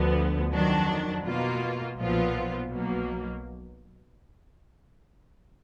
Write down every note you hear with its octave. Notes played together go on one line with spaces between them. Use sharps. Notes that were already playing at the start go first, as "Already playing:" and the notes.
Already playing: D2 D3 F3 B3
F2 D#3 F#3 D4
B2 A#3 F4
B1 A#2 F3 B3 F4
B1 B2 F#3 A#3